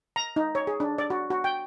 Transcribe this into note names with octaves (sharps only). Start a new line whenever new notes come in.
A#5
D#4
C#5
G#4
D4
D5
F#4
F#4
G5